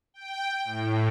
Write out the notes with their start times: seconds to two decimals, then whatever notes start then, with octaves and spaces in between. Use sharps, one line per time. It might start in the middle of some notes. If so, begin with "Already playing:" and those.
0.14 G5
0.65 A2